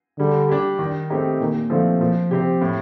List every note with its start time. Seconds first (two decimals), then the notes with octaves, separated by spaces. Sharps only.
0.18 D3 G3
0.49 D4 G4
0.79 D#3
1.10 A3 C4 D#4 G4
1.40 A#2 D#3
1.70 D3 F3 A3 C4 F4
2.00 A#2 F3
2.31 C3 C4 G4
2.61 A2